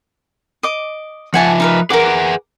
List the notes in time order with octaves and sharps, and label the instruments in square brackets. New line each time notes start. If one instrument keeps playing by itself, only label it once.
[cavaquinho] D#5 D6
[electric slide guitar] F3 F4 E5 [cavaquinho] F#5 G#5 A5
[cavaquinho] D#4 A#4 B4
[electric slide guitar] G#4 B4 F#5 [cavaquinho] A#4 D6